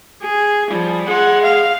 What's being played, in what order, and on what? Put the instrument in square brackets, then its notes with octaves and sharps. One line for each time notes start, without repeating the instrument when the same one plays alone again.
[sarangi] G#4
[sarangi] F3 [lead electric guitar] G3
[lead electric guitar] G#4 C6 [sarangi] F#5
[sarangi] F5